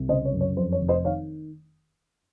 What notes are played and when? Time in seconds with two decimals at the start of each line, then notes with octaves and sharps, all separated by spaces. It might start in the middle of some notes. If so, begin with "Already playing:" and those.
Already playing: C2
0.09 C#3 C5 D#5
0.25 C#5
0.32 F#2
0.41 C#5
0.57 F2 C5
0.72 C#5
0.81 F1
0.88 C5 D#5
1.04 D#3 C#5 F5